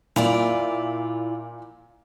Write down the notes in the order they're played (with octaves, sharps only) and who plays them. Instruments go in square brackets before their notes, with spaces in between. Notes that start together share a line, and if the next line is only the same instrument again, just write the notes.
[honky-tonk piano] A#2 F7 [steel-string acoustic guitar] E4 F4 D5